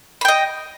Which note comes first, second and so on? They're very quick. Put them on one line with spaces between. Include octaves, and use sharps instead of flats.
B5 G5 D#5